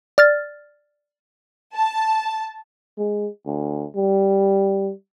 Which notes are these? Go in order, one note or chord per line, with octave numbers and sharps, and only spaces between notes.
D5 F6 A6
A5
G#3
D2
G3